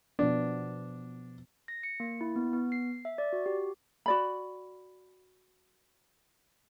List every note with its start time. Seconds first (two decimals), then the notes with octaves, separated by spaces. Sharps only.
0.19 B2 F3 B3 D4
1.68 A#6
1.83 C#7
2.00 A#3
2.21 E4
2.36 B3
2.53 B3
2.72 C7
3.05 E5
3.18 D5
3.33 F#4
3.46 G4
4.06 F#4 D5 B5